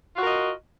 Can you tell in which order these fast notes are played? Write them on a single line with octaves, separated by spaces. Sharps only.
F4 F#4 A#4 D#5